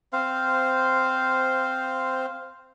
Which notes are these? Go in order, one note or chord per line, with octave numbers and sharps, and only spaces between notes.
C4 C5 F5